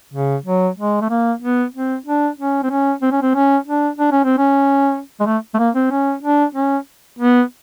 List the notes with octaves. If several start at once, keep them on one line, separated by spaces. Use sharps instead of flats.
C#3
F#3
G#3
A3
A#3
B3
C4
D4
C#4
C4
C#4
C4
C#4
C4
C#4
D4
D4
C#4
C4
C#4
G#3
A3
A3
A#3
C4
C#4
D4
C#4
B3